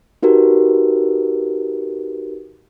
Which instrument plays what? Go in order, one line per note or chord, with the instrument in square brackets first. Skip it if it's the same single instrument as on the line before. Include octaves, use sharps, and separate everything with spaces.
[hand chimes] D#4 F#4 G4 A#4 B4